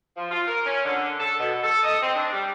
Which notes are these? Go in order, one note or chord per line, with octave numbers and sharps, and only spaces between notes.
F3
F4
A#4
C#4
D3
A4
B2
A4
D#5
C4
D4
G3